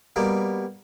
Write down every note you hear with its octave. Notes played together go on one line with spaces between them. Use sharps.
B2 G3 A#3